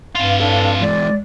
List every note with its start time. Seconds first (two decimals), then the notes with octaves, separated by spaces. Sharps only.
0.15 G2 C3 F4 F5
0.40 D4 A4 C#5
0.81 E3 G#3 D5